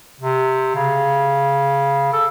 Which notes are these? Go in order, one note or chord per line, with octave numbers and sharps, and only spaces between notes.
C3
C#3
A4